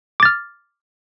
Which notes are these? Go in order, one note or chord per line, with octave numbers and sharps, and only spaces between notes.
D6 F6 A6